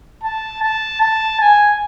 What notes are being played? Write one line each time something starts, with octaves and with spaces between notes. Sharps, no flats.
A5
A5
A5
G#5